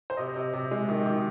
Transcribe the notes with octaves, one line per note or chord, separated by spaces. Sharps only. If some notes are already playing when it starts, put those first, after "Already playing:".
C5
C3 D#5
C3
C3
G#3
D#3
D#3